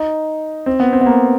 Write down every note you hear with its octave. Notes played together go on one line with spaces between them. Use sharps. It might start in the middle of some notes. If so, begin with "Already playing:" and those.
Already playing: D#4
C4
B3
C4
B3
A#3